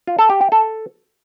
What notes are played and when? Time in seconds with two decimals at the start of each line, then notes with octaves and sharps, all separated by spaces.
0.07 F4
0.19 A4
0.30 G4
0.41 G4
0.52 A4